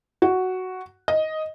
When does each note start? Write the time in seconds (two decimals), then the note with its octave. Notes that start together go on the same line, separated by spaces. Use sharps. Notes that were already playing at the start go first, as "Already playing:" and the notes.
0.22 F#4
1.08 D#5